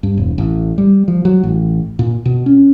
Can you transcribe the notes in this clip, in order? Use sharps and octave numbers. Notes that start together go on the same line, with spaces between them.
G2
E1
A1
G3
F3
F#3
A1
A#2
B2
C#4